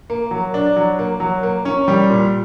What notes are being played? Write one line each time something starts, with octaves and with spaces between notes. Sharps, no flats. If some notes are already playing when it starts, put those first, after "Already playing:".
A#3
F#3
D4
F#3
A#3
F#3
A#3
C#4
G3
A#2